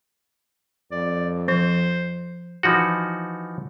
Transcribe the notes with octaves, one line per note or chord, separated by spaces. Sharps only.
F2 D5
F3 C5
E3 F3 D#4 F#4